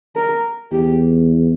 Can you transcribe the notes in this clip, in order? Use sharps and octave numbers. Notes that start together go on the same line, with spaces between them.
A#4
E2 G4